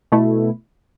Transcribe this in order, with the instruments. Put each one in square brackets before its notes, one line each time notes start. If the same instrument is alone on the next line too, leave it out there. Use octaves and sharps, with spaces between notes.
[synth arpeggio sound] B2 A3 E4